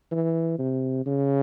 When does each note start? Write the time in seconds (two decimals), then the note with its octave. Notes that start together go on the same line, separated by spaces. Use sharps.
0.12 E3
0.59 C3
1.06 C#3